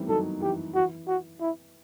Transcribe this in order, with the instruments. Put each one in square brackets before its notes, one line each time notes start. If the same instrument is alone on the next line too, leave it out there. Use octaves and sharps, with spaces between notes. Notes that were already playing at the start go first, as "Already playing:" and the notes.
Already playing: [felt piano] E3 G3 A3 B3 C4 D#4
[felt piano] D#3 F#3 [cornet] A4
[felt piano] E3 [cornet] G4
[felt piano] E3 [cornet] F#4
[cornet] F#4
E4